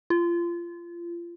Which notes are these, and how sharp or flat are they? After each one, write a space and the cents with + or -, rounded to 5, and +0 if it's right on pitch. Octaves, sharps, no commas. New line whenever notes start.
F4 -25